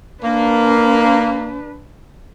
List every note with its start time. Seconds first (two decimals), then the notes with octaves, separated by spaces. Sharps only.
0.23 A#3 D4 B4